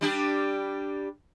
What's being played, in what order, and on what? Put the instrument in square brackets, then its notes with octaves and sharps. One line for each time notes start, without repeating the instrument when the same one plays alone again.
[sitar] G3 D4 G4